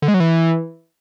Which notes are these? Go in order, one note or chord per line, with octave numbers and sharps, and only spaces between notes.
D3
G#3
F#3
E3